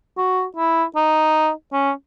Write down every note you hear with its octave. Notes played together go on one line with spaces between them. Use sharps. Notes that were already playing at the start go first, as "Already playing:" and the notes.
F#4
E4
D#4
C#4